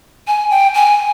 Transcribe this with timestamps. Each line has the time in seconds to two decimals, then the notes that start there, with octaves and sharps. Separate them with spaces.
0.27 G#5
0.51 G5
0.74 G#5